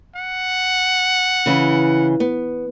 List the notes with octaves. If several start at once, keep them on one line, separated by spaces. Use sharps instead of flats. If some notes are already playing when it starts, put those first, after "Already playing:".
F#5
C#3 E3
B3